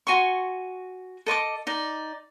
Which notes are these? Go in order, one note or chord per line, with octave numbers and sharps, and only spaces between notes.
F#4 G#5 C6 C#6
A4 D#5 C#6 D6
D#4 D5